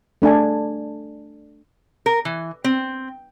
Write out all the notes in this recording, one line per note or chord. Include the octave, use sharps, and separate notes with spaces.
A3 D4 A4 G#5
A#4
E3
C4